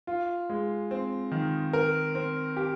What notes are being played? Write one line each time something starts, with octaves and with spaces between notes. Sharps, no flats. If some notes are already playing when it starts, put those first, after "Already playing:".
F4
G#3
C4
D#3
A#4
C4
G4